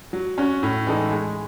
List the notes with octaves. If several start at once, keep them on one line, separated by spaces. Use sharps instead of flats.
F#3
C#4 F#4
A2
E3 G#3 D#4 A4
G#3